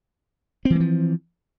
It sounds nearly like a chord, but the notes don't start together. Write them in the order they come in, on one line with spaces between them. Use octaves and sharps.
C4 E3 G#3 F3